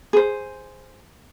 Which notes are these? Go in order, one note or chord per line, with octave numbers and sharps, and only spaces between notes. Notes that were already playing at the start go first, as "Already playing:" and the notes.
G#4 C5